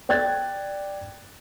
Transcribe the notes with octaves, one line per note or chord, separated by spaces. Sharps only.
D5 G5 F#6 G#6 A6